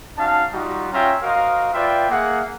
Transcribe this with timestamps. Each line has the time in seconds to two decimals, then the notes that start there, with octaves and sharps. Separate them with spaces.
0.17 C#4 D#4 F#4 F5 A5
0.53 G3 D#4 F4 F#4
0.92 C#4 F4 C#5 E5 G5 A#5
1.22 F#4 A#4 C5 D#5 F5
1.74 F4 B4 D5 E5 G5
2.10 A#3 G#4 E5 F#5